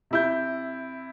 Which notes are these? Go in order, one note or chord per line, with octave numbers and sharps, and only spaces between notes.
C3 E4 G6